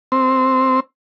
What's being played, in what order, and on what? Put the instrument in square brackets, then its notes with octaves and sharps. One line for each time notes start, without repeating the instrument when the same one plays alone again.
[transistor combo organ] C4